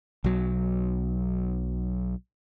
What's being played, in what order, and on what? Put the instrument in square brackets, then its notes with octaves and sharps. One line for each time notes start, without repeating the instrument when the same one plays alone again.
[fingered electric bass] B1 F#3